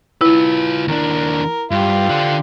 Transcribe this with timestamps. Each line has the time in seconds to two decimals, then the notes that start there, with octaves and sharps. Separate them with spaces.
0.21 E4 F4 B4
0.88 D#2 D4 A#4
1.71 G2 F4 G4
2.10 D3 D4